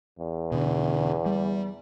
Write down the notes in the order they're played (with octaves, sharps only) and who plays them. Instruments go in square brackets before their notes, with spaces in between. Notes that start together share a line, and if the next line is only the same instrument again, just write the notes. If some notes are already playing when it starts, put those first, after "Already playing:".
[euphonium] E2
[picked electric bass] B2 D3
G3